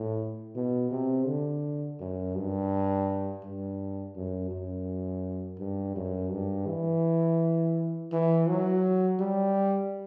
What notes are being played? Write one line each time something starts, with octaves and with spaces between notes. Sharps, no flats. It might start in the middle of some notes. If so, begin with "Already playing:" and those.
Already playing: A2
B2
C3
D3
F#2
G2
G2
F#2
F#2
G2
F#2
G2
E3
E3
F#3
G3